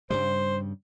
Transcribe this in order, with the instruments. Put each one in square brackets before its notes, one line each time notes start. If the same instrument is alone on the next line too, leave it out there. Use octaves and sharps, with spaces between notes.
[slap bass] G2 C#3 G3 [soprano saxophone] C5